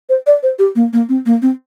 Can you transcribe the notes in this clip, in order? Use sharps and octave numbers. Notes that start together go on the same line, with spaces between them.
C5
D5
C5
G4
A#3
A#3
C4
A#3
C4